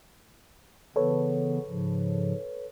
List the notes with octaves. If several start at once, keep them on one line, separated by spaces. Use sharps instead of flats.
C#3 E3 B3 A4 B4 C#5
G#2 C#3 F3